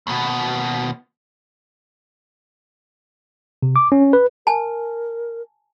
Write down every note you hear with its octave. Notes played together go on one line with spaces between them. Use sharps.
D#2 B2
C3
D6
C#4
B4
A#4 G#5 A5